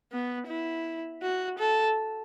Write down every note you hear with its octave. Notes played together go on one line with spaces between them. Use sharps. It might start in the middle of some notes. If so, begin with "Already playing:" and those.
B3
E4
F#4
A4